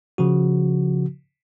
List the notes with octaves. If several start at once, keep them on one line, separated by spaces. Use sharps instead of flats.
C#3 F3 F#4